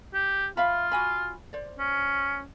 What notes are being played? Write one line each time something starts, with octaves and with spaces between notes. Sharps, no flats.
G4
F4 E5 F5 B5
F#4 G#5 B5
C5 D5
C#4